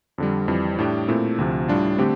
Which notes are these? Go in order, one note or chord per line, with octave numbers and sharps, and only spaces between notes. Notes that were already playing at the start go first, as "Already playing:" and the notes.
F2 D3 G3
F2 E3 G3
A2 G3 D4 G4
A#2 A3 C4 E4
D2 C3 F3
A2 G3 D4 F4
D3 A3 C4 G4